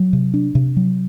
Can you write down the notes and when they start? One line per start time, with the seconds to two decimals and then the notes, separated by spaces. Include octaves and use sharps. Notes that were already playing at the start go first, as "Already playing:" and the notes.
Already playing: F#3
0.13 C3
0.34 D4
0.55 C3
0.77 F#3